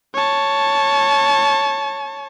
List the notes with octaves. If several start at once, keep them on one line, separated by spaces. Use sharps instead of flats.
C#5 A5